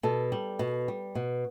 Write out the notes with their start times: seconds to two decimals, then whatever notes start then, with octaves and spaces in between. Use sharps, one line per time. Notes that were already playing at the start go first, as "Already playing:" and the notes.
0.03 B2 A4
0.32 G3
0.59 B2
0.88 G3
1.15 B2